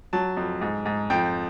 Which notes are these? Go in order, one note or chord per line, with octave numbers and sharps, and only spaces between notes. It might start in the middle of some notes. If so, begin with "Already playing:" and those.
F#3 A5
F2
G#2
G#2
F2 G5